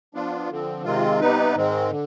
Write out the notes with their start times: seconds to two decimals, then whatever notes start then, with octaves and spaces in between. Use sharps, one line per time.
0.14 F3 B3 D4 F4
0.50 D3 F3 C4
0.85 C3 D#3 G#3 C4 F4
1.21 C3 G3 B3 D#4 B4
1.56 G#2 D#3 G#3 C4
1.91 D3